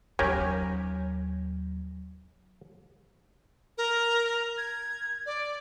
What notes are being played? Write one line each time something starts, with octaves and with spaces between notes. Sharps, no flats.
D#2 F#3 C#4 G4 A#4 G#5
A#4
G#6
D5